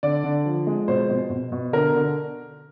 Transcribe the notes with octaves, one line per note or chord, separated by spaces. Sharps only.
D3 D5
D3
F3
G#3
B2 C5
B2
B2
B2
D3 A#4
D3